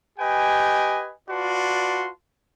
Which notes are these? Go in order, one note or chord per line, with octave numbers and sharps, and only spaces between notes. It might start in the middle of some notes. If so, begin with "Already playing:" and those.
G4 B4 D#5 G5 G#5
F4 F#4 B4 D5 A5 C6